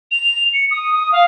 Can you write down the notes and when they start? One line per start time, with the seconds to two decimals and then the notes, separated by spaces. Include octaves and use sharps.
0.11 F7
0.53 C#7
0.71 D#6
0.93 D#6
1.12 F5